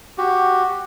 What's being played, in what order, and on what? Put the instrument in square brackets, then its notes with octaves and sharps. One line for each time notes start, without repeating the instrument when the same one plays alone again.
[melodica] F#4 G4